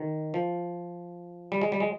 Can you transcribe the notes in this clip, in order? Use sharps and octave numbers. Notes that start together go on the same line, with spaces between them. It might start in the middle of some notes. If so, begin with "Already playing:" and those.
Already playing: D#3
F3
G3
G#3
G3
G#3